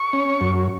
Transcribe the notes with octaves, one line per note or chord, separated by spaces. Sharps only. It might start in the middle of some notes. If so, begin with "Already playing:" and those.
Already playing: C#6
C#4
F#2